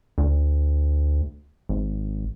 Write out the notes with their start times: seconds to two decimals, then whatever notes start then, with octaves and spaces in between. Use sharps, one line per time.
0.18 D2
1.69 G#1